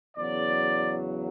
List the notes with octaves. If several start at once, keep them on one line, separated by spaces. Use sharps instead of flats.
E2 C#3 F#3 D5